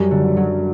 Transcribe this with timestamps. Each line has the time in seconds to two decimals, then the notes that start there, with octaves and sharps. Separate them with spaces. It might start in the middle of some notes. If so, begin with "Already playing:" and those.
Already playing: F#2 G3
0.11 D3
0.37 F#3